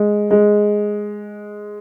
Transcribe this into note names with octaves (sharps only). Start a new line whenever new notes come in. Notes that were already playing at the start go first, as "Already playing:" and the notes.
Already playing: G#3
G#3